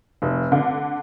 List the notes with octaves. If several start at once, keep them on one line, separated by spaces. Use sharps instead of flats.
F1
D3